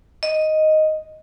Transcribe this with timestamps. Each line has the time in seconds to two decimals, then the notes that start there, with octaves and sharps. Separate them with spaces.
0.23 D#5